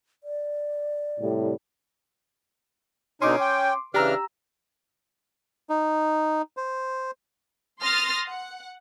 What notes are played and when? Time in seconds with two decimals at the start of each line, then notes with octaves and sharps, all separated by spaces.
0.24 D5
1.20 A2 C3 G3
3.22 B2 D3 C#4 D#4 C6 D6
3.41 G5
3.94 C#3 E3 D4 G4 A#5 E6 F6
5.70 D#4
6.57 C5
7.81 C6 D#6 F6 A6 A#6
8.27 F#5